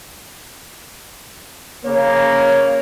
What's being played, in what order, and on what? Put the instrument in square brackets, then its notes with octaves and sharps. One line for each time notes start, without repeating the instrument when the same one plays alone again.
[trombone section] C#3 A#3 [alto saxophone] C#5